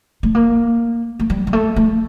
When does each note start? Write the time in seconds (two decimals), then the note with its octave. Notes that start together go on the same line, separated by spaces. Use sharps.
0.23 A3
0.35 A#3
1.19 A3
1.30 G3
1.47 G3
1.53 A3
1.76 A3